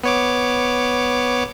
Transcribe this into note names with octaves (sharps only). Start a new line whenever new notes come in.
B3 C#5 D6